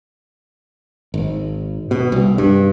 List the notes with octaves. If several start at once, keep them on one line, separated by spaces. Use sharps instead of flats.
G#1
B2
C2
G2